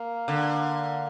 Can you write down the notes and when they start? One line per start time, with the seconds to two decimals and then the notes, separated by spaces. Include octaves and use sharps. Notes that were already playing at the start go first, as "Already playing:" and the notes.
Already playing: A#3
0.28 D3